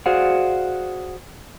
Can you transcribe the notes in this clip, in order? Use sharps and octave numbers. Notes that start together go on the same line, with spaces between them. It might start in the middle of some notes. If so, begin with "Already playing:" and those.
F#4 G#4 C5 D5 F5 F#5